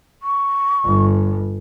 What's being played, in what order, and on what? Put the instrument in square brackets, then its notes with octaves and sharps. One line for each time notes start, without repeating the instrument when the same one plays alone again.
[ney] C#6
[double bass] G1